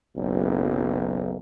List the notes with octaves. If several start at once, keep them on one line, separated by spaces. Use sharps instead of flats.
F#1 B1